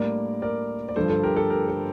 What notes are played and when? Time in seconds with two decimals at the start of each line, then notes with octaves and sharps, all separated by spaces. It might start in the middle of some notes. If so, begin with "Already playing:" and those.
Already playing: A2 G3 A#3 D4 A#4 D5
0.42 A#4 D5
0.89 D5
0.96 G2 D3 F3 A4 C5
1.10 A4 C5
1.23 G4 A#4
1.36 A4
1.50 G4 A#4
1.68 A4